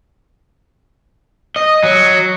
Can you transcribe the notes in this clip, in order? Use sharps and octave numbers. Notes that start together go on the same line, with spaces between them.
D#5
F#3